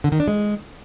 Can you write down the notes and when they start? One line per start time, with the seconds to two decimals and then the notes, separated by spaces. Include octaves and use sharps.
0.04 D3
0.12 D#3
0.20 D4
0.28 G#3